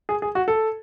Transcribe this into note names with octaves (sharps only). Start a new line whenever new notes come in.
G#4
G#4
F#4
A4